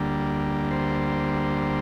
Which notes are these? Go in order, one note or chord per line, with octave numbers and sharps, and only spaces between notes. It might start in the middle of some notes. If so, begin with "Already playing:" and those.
Already playing: D2 D3 G3 A#3
C5